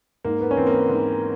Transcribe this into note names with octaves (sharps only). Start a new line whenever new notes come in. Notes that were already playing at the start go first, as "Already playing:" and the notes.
G#2 A#3
B3
C#4
E3 C4
A#3
B3
G#2